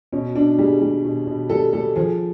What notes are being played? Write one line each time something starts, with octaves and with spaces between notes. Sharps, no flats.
B2 C#4
B2 D4
G3 G#4
G3
B2
B2
G3 A4
G3 A4
F3 G#4